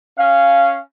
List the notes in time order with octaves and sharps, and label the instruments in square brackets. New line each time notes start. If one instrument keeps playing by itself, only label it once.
[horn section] C#4 F5